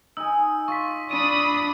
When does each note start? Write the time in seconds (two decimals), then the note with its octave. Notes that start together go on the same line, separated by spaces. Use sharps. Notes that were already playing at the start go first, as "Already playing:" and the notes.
0.17 D#4 G#5 E6
0.68 F4 C#6 B6
1.11 D4 B5 D#6 D#7